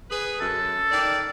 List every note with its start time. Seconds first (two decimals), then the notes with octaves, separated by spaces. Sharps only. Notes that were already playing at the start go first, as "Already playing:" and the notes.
0.11 G#4 B4
0.40 F#2 A4
0.92 D#3 D5